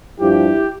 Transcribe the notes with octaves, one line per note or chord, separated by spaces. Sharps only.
G2 F3 E4 G4